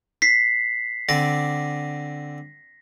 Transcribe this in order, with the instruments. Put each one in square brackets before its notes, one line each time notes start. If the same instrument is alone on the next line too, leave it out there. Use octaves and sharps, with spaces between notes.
[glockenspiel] B6 C7
[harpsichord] D3 C4 D5 [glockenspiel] A#6